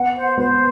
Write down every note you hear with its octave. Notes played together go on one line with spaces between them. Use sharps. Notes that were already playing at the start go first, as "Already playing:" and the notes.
Already playing: B3 F#5
C5
B3 C5